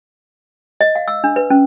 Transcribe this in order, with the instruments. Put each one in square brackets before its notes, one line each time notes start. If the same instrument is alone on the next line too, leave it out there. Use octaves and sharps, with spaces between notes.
[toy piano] D#5
F5
E6
D4
B4
C#4